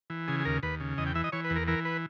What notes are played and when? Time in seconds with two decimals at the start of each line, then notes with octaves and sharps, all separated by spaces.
0.10 E3
0.28 C#3 G#4
0.40 G#4
0.45 D#2 A#4
0.63 D#2 B4
0.80 C#3
0.98 E2 D#5
1.07 G5
1.15 E3 E5
1.24 D#5
1.32 E3 C#5
1.44 B4
1.50 E2
1.56 A#4
1.68 E3 A#4
1.85 B4